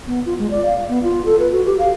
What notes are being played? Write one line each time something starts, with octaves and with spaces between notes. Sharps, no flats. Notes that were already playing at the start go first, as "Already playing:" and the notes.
B3
F4
G#3
D5
F5
B3
F4
A4
B4
F#4
G4
F5